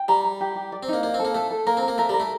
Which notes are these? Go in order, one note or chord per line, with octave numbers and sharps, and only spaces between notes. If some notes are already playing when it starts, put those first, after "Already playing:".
Already playing: G5
G3 A#5
A#5
G4
G4
D5
C4
A#3 D#4
A#3 D5
C4
A4
A#3
A3 A4
A4
A#3 A#4
C4
A#4
A#3
A3 A#4
G3 A#4
A3